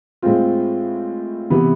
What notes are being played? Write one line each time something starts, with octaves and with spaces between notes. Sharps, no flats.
A2 G#3 C4 F4
C3 E3 B3